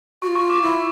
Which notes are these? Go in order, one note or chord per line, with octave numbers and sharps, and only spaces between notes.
F#4 C#6
F4
C#6
D6
E4